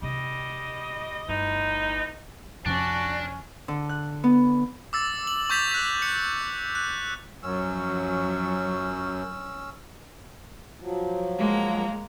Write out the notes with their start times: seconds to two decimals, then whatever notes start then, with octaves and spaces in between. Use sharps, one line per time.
0.02 C3 G3 D#4 D#5
1.29 G1 E3 A3 D#4
2.66 F2 C3 F3 C#4 D4 F#4
3.68 D3
3.89 F#6
4.24 B3
4.93 D6 E6 A6
5.27 F#7
5.50 C#6 D6 G6 A6 B6 F7
5.71 F#6 B6
6.02 C#7
6.75 F#6
7.43 F#2 F3 F#3 C#4 E6
10.81 F3 F#3
11.38 G#3 A#3 A#5